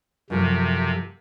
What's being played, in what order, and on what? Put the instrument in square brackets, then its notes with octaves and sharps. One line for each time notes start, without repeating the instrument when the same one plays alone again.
[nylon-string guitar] F#2 F3 A3 [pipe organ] C3